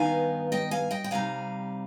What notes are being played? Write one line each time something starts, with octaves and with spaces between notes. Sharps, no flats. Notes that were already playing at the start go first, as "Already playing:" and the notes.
Already playing: G2 D#3 B3 D#4 F5 G#5
D#5 G5
F5 G#5
D#5 G5
G5
C3 G3 C4 D#4 F5 G#5